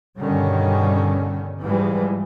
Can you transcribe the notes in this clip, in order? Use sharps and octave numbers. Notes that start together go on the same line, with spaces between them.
G2 B2 D3 D#3 G3 C#4
G#2 E3 F3 G3 G#3